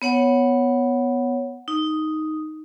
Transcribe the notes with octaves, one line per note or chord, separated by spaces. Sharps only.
B3 C#5 F#5
D#4